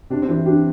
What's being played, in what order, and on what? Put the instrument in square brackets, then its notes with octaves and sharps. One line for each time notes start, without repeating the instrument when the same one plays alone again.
[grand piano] C3 [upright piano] D4
[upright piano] C4
[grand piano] E3
[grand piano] D4 [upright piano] G4